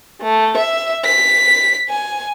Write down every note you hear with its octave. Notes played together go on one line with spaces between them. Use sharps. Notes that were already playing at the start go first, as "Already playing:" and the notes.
A3
E5
B6
G#5